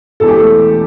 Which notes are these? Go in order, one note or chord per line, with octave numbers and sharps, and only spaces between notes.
E1 E2 E3 A4
G4
A3 A4